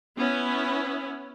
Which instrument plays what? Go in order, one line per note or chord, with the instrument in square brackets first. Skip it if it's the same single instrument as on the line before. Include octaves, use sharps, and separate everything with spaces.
[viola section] B3 C#4 E4